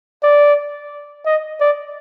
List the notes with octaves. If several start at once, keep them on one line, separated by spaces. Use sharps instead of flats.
D5
D#5
D5